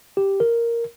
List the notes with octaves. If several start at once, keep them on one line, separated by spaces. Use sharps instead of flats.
G4
A#4